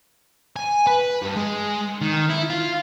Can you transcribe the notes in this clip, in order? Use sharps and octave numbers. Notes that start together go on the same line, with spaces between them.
G#5
B4
G2
G#3
D#3
E4
F4